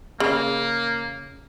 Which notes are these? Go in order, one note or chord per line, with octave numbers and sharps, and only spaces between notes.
C#3 A#3